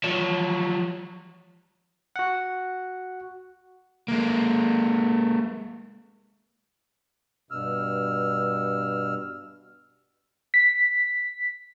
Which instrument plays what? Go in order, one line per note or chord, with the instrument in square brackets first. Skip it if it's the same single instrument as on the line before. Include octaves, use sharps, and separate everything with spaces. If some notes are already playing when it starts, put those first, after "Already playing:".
[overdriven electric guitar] F3 F#3
[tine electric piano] F#4 F#5
[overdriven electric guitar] G#3 A#3
[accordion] G2 B2 E6 F6
[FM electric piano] B6